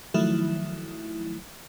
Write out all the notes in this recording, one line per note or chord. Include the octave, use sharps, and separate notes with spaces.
D#3 F3 F#3 A3 E4